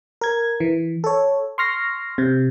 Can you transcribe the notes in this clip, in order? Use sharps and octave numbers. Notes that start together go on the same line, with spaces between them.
A#4 G#6
E3
A4 C#5
C6 C#6 F6 A#6 C7
C3